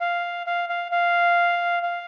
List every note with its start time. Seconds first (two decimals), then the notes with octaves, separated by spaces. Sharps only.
0.01 F5
0.47 F5
0.69 F5
0.92 F5
1.83 F5